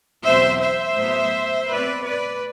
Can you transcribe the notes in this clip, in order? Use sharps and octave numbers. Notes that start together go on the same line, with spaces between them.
E2 B2 F#3 A3 C4 C5 E5
C5 E5
A2 F#3 B3
B2 A3 C4 B4 D5
B4 D5